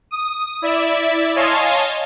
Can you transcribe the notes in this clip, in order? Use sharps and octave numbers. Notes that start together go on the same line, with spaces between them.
D#6
E4 D5 E5
C#5 D#5 F5 G#5 A5 C6